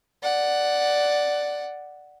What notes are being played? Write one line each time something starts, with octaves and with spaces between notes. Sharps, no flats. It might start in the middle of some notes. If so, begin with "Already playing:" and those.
D5 F#5